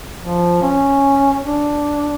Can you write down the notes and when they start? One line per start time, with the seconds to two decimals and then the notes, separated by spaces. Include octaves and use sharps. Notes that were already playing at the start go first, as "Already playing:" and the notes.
0.20 F3
0.62 C#4
1.46 D4